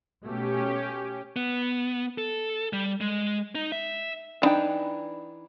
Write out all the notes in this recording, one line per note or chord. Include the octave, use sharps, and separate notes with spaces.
B2 A3 C#4 G4
B3
A4
G3
G#3
D#4
E5
D#3 E3 D4 D#4 G5